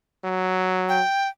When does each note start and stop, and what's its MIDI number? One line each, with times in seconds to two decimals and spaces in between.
0.24 1.01 54
0.89 1.28 79